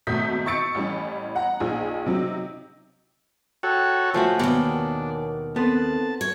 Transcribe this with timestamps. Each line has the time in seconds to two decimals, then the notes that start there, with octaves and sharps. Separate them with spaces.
0.07 G#1 B2 A3 D#6 G6 B6
0.46 D#5 C#6 E6 A6 C#7 D7
0.75 A1 E3 G3 C#4
1.36 F#5 A#5
1.60 A#1 D#4 G#4
2.06 C3 F#3 C4 D#4
3.63 F#4 A4 C#5 G5
4.14 F3 A3 F#4 C#5 G#5 A5
4.39 D#2 B2 D#3 D4
5.56 B3 C4 A4 A5 C6
6.21 C#5